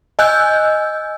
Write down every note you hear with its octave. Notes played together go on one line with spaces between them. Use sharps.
D#5 G#5 E6 F#6 G6